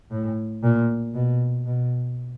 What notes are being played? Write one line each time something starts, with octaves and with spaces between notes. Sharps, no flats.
A2
A#2
B2
B2